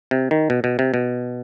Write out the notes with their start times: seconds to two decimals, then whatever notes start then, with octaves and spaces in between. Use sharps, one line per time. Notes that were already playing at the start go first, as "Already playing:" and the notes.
0.11 C3
0.31 D#3
0.50 B2
0.64 B2
0.79 C3
0.94 B2